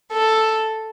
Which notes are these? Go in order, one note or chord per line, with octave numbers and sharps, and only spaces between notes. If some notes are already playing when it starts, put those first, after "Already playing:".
A4